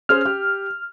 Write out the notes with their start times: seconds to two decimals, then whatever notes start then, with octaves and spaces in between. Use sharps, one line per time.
0.09 C#4 G#4 C5 F6
0.25 G4